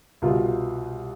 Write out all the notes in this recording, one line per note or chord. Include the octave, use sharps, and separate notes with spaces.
C2 B2 F4